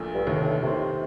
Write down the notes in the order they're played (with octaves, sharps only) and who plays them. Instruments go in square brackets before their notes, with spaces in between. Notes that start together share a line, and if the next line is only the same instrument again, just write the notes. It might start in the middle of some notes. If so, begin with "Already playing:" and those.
Already playing: [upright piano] A#1 A#2 A3
[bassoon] G2
[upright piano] F1 D#2 D3 [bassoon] A2
[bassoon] A2
[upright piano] D#2 D#3 A3 C4 [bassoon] C3